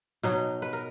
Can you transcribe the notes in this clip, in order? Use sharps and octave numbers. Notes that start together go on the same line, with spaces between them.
B2 F#3 D#4
B4
A#4